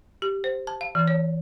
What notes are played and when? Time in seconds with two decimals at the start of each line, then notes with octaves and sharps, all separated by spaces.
0.22 G4
0.44 C5
0.67 A5
0.81 F5
0.95 E3
1.08 C#5